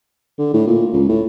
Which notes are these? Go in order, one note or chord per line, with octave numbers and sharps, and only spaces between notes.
D3
A2
A#2
C#2
A2